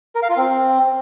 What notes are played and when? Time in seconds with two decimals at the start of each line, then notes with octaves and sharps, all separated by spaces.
0.15 A#4
0.23 F5
0.30 F4
0.37 C4